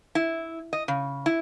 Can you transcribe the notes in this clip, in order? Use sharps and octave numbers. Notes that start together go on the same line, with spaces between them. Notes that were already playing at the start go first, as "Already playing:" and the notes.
E4
D#5
C#3
E4